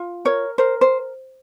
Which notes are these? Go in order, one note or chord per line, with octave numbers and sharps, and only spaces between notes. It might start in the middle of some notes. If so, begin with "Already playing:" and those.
Already playing: F4
A#4 C#5
A#4 C5
C5